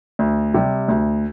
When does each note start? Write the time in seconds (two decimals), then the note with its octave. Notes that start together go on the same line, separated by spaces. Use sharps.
0.19 D2
0.54 C3 G3
0.88 D2